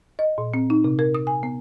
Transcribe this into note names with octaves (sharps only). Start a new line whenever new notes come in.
D#5
A#2
C4
D#4
C3
A#4
D#6
G#5
B3